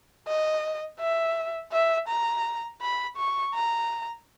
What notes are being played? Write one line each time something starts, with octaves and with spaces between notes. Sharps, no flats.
D#5
E5
E5
A#5
B5
C#6
A#5